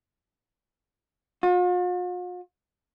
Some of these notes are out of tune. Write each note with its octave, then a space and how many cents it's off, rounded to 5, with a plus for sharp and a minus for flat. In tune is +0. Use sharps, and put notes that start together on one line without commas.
F4 +45